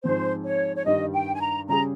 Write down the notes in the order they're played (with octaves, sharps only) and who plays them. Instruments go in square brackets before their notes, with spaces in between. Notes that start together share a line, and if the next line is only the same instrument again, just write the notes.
[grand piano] G#2 F3 C4 [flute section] C5
[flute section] C#5
C#5
[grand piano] G2 D#3 G3 [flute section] D#5
[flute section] G5
G#5
A#5
[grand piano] C#3 G3 C#4 G#4 [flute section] A#5